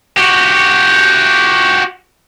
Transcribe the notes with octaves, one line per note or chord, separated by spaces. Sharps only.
F#4 G4